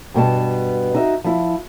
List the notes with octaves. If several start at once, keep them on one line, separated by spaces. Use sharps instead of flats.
G2 B2 B3 A5
D#4 F#4 E5
F3 E4